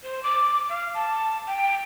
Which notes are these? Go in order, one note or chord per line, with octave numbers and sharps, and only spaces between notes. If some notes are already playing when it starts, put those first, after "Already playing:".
C5
D6
F5
A5
G5